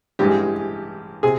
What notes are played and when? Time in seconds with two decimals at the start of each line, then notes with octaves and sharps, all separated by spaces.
0.19 A1 G2 E3 G#3 G4
1.23 C3 G#4